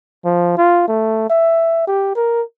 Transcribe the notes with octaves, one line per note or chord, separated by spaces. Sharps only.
F3
F4
A3
E5
G4
A#4